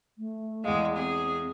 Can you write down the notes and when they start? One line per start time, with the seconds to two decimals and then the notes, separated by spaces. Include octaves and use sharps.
0.18 A3
0.64 E2 G#3 F5
0.96 C4 G#4